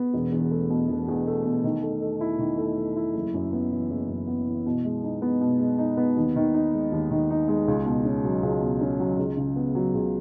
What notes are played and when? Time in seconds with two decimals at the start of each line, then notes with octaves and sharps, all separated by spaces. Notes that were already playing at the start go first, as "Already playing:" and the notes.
Already playing: B3
0.14 E1
0.32 E2
0.51 A3
0.70 B2
0.88 E1
1.08 E2
1.27 A3
1.45 B2
1.64 D#3
1.82 A3
2.01 A4
2.21 E4
2.39 D#3
2.58 A3
2.77 A4
2.96 E4
3.14 F#1
3.34 F#2
3.53 B3
3.72 E3
3.90 F#1
4.09 F#2
4.27 B3
4.47 E3
4.66 B2
4.85 G#3
5.03 D#4
5.22 B3
5.41 B2
5.60 G#3
5.78 D#4
5.97 B3
6.17 D#2
6.36 D#3
6.54 D#4
6.73 G#3
6.92 D#2
7.10 D#3
7.30 D#4
7.48 G#3
7.68 C#2
7.86 B2
8.05 C#4
8.24 F#3
8.43 C#2
8.62 B2
8.81 C#4
9.00 F#3
9.19 C#2
9.37 C#3
9.56 B3
9.75 F#3
9.94 C#2